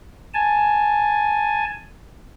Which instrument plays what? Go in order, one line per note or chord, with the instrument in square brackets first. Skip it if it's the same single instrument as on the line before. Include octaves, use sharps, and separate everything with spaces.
[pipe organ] G#5 A5